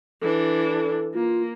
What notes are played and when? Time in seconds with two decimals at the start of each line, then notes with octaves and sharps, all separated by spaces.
0.22 E3 D4 A4
1.15 A#3 F4